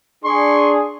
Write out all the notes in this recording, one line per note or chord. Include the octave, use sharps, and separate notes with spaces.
D4 G#4 C6 C#6